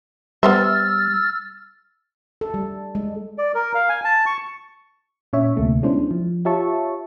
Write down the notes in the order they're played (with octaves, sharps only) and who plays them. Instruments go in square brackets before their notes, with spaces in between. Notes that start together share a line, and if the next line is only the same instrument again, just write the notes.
[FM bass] G3 [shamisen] B3 C5 E5 [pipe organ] E6 F6 A6
[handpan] A4
G3
G#3
[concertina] D5
A#4
F5
G#5
A5
C#6
[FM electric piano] A#2 C#4 C#5 E5
D2 C3 A3 A#3
G#3 B3 C#4 D4 E4 C5
F3
F4 G4 C#5 E5 A5 C#6